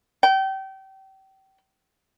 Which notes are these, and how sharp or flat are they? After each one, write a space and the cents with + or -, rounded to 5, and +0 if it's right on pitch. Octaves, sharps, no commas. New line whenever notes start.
G5 -30